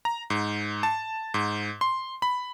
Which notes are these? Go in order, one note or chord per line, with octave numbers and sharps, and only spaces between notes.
A#5
G#2
A5
G#2
C6
B5